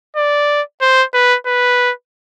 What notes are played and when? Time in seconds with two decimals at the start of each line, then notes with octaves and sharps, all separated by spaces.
0.16 D5
0.81 C5
1.14 B4
1.46 B4